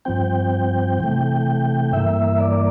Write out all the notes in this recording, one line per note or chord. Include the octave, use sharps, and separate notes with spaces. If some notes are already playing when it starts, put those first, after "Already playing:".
G2 F3 C4 G5
C3 E3 A3
G2 E3 A#3 E5
D5